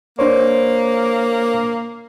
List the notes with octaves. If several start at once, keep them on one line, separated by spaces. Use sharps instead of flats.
A#3 D4 C5 C#5